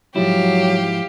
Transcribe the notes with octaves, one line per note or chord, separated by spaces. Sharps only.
G#2 F3 F#3 E4 G4 F5